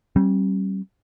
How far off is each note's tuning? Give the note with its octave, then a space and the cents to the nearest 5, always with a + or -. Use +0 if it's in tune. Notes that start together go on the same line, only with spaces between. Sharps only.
G3 -30 C#4 -45